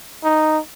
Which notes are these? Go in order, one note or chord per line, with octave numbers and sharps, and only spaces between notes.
D#4